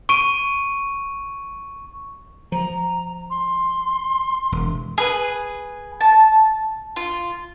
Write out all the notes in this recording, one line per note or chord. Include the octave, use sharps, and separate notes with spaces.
C#6 D7 D#7
F3 A#5
C6
E1
G#4 B4
A5
F4